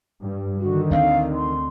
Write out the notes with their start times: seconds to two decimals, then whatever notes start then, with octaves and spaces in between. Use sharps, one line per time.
0.22 G2 G3
0.60 D3 D#3 F#4
0.91 D2 A#3 C4 F5
1.34 C6